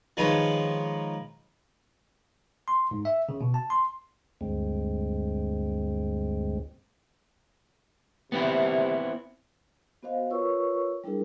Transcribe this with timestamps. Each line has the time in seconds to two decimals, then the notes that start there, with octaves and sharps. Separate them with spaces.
0.17 D#3 F3 G#3 D#4 B4 C#5
2.68 C6
2.91 G#2
3.05 E5
3.29 C#3
3.41 B2
3.54 A5
3.70 C6
4.41 D2 G2 G#3 C4
8.32 C3 B3 C4 E4
10.03 B3 F#4 C5 D#5 F5
10.30 F4 A#4 B4 C#5 C#6 E6
11.04 G3 D4 E4 G#4 A#4